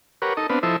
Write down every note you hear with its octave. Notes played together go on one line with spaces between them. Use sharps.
G4 A#4 B4 C#5 F#5
D#4 A4 D#5
B3 C4 D4 B4 F5
F3 E4 A4 C5 D#5 E5